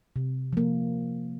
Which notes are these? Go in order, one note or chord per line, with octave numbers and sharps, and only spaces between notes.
C3
F3 A#3